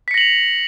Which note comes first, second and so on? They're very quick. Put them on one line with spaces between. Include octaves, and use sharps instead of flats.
B6 C#7 A#6 F#7 F7